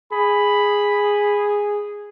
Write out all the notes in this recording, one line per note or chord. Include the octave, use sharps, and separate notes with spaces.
G#4 B5